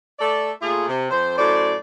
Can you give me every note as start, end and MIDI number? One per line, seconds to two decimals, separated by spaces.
0.19 0.51 57
0.19 0.51 69
0.19 0.51 74
0.62 0.86 46
0.62 0.86 57
0.62 0.86 65
0.62 0.86 68
0.88 1.08 48
1.11 1.37 41
1.11 1.37 72
1.38 1.76 42
1.38 1.76 45
1.38 1.76 72
1.38 1.76 74